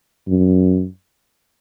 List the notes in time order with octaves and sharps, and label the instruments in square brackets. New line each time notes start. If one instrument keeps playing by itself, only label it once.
[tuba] F#2